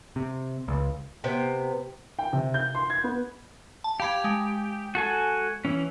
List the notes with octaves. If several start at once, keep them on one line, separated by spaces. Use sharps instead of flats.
C3
C#2
C3 B3 G5
G5
C3
G6
C6
G#6
B3
A5
G4 F5 B5 G#6
G#3
F#4 A4 G#5
E3 C#4